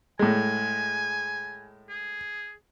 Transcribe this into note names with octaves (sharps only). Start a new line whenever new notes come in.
A2 G#3 G#5
G#4